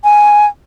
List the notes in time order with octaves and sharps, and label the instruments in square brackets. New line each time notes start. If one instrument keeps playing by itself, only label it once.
[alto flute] G#5